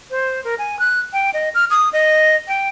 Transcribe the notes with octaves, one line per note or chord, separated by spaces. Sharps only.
C5
A#4
G#5
F#6
G5
D#5
F6
D#6
D#5
G5